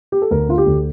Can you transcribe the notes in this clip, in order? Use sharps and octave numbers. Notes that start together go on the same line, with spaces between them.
G4
A4
D2 A#4
D3 F4
G4
D2